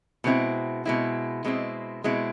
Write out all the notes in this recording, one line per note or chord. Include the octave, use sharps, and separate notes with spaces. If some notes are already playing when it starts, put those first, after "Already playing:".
B2 G#3 C4 E4
B2 G#3 C4 E4
B2 G#3 C4 E4
B2 G#3 C4 E4